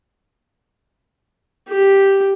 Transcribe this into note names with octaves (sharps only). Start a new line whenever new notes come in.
G4